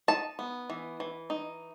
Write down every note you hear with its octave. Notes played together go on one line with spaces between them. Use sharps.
D#4 A5
B3
E3
E3
D#4